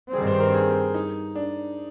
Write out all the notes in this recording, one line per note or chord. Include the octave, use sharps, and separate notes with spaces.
G2 D#3 G3 C4 G#4
C5
A#4
G#4
D#4
D4